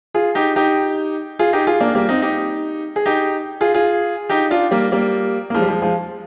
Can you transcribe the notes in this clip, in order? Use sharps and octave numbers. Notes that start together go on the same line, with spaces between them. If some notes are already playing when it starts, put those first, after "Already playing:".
F4 G#4
D#4 G4
D#4 G4
F4 G#4
D#4 G4
F4 G#4
A#3 D4
G3 A#3
C4 D#4
D#4 G4
G#4
D#4 G4
F4 G#4
F4 G#4
D#4 G4
D4 F4
G3 A#3
G3 A#3
A#3
F3 G#3
G3
F3 G#3
F3 G#3